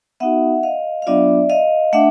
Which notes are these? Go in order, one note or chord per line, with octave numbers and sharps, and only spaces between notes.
B3 D#4 F#4 E5 F#5
D#5 F5
F5
F#3 B3 D4 F4 D5 E5
D#5 F5
A3 D4 E5 F#5